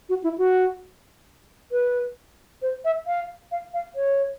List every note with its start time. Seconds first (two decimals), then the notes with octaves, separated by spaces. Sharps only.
0.09 F#4
0.24 E4
0.38 F#4
1.72 B4
2.62 C5
2.85 E5
3.07 F5
3.52 F5
3.74 F5
3.95 C#5